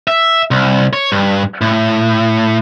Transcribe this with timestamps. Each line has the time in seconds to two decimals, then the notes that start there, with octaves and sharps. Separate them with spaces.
0.08 E5
0.51 C2
0.93 C#5
1.12 G2
1.61 A2